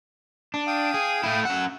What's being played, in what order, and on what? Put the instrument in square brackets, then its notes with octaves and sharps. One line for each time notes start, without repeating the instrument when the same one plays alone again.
[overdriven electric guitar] D4
[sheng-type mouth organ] F5 G5 D#6
[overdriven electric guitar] G#4
A3 E4
[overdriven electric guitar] C#4 F#5 [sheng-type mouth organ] E6